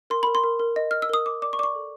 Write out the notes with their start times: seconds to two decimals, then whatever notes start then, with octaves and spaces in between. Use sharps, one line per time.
0.10 A#4 C6
0.23 A#4 B5
0.35 C6
0.44 A#4
0.60 A#4
0.76 D#5
0.91 D#5 F6
1.02 E6
1.09 A#4 D#6
1.26 A#4 D6
1.42 D5 D6
1.53 C#6
1.59 D5 D6
1.63 C#6
1.75 A4